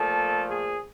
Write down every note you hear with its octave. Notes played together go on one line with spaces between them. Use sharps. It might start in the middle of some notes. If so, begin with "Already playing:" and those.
Already playing: A#2 F3 A3 A4
G#4